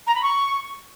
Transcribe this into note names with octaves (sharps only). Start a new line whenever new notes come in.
A#5
B5
C#6